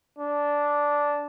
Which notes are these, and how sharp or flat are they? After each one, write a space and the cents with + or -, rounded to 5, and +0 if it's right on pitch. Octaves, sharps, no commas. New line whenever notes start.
D4 -10